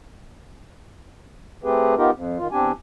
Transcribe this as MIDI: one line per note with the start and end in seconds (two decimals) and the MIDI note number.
1.64 1.95 57
1.64 1.95 60
1.64 1.95 67
1.64 1.95 68
1.64 1.95 71
1.97 2.11 59
1.97 2.11 63
1.97 2.11 65
1.97 2.11 67
1.97 2.11 70
2.14 2.38 41
2.38 2.48 51
2.38 2.48 65
2.52 2.72 40
2.52 2.72 60
2.52 2.72 62
2.52 2.72 67
2.52 2.72 80